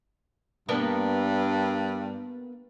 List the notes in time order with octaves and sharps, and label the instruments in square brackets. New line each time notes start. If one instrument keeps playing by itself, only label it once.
[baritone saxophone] G2 [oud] A#3 B3 D4